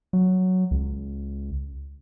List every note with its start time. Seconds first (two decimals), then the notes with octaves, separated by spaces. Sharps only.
0.13 F#3
0.71 C#2